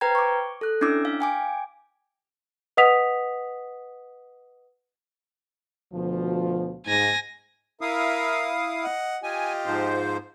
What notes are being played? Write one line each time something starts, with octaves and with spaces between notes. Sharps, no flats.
B4 C5 G5 A#5 G#6
C#6 D6
A4 F#6
C#4 D4 E4 D6 E6
F5
G5 G#5 D6
B4 D#5 F#5 D#6 B6 F7
D2 B2 F3
G#2 G#5 A#6
E4 A#4 E5 F5 D#6
D#5 F#5
F4 G4 D#5 G#5
G#2 F3 C5